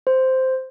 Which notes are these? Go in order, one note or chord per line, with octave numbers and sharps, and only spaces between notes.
C5